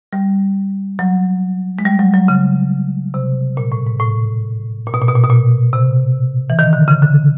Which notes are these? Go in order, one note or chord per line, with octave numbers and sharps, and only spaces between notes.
G3
F#3
G#3
G3
F#3
F#3
C#3
C3
A#2
A2
G#2
A2
A#2
B2
A#2
B2
A#2
B2
A#2
C3
E3
D#3
D3
C#3
D3